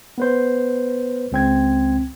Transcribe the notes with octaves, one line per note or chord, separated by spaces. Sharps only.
B3 B4 C5
C#2 C4 G#6